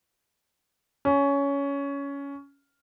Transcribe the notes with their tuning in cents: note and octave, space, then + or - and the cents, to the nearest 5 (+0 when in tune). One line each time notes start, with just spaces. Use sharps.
C#4 +15